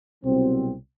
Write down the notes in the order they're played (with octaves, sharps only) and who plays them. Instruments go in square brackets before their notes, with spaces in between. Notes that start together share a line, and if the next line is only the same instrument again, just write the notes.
[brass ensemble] C2 B2 F#3 C4